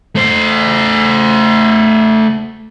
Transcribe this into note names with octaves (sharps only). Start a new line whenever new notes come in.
A3 C5